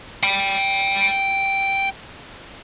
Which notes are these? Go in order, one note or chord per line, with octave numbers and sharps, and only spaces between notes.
G5 B5